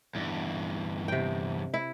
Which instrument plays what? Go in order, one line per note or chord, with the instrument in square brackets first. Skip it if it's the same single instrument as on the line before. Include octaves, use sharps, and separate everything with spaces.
[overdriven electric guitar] E2 G2
[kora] C3 G5
E4